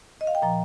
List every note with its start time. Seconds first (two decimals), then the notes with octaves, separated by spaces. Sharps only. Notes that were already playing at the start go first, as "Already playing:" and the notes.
0.21 D#5
0.27 F5
0.35 G5
0.42 A#2 F3 A#5